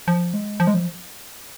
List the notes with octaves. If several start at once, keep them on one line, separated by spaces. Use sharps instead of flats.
F3
G#3
F3
G#3
F3